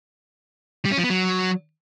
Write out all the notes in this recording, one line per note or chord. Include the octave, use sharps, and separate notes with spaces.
G3
C#4
F3
B3
F#3